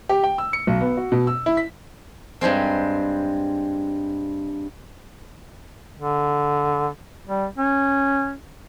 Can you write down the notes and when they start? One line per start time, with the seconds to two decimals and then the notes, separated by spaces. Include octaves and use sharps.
0.09 G4
0.24 G5
0.38 E6
0.53 C#7
0.67 B1
0.81 B3
0.97 F#4
1.12 B2
1.27 E6
1.46 E4
1.57 B6
2.41 G2 G3 G#3 C4
5.99 D3
7.27 G3
7.58 C#4